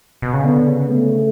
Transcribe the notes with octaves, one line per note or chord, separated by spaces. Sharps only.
B2
C#3
D3 B3
C#3
A3